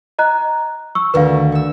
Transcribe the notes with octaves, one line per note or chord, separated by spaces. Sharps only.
D#5 A#5 F#6
C#6 E6
D2 D#3 B4 F5
C#6 E6